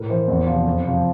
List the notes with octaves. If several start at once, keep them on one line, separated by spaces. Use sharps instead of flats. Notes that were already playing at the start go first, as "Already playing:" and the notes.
Already playing: A2 A#4
E3 C5
E2
C3 F3
F2
C3 F3